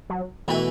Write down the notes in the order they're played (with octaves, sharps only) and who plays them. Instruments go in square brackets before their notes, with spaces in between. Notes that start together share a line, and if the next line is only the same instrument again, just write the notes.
[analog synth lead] F#3
[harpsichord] B2 A3 E4 B4 [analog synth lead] E3